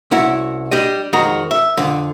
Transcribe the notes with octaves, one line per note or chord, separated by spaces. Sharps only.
C2 C#4 E4 F#4
G3 D4 G4 D#5
F2 D#3 G#3 F#4 A#5
E5
F2 D3